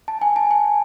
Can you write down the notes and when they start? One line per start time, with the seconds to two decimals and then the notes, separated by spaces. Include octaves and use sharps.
0.08 A5
0.22 G#5
0.36 A5
0.51 G#5